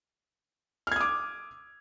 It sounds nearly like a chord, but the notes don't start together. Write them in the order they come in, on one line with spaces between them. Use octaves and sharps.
F6 G#6 D#6 D6